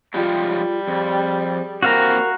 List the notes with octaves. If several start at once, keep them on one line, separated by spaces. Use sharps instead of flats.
F3 G3 G#3 F4 G4
F2 G#4
E3 A#3 C4 F#4 A#4 F5 A#5